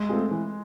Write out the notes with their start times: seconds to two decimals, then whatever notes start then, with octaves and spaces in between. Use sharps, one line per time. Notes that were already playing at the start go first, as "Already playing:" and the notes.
Already playing: G#3
0.09 A3 C4 F4 G#4
0.31 E3